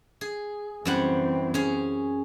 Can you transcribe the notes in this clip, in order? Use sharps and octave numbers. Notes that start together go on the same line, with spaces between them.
G#4
F#2 E3 G3 C4 F#5
C#4 G#4